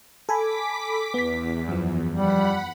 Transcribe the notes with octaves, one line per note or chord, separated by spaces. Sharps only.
A4 G#5 B5 D6 B6
E2 B3 B6
F#2 F3
G3 F#5 B5